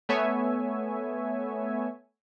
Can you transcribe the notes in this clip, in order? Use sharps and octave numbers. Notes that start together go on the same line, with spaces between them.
A3 B3 C#5 E5 G#5